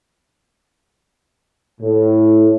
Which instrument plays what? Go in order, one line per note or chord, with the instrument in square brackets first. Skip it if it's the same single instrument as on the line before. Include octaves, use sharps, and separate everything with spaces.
[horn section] A2